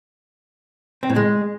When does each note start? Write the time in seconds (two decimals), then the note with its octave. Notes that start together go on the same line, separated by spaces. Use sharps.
1.03 C4
1.10 A2
1.16 G#3